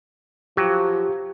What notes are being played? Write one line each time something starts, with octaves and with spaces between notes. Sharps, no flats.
F3 F#3 G4